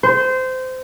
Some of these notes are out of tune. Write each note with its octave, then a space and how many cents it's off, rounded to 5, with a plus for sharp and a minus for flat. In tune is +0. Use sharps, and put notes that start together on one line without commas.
C5 -20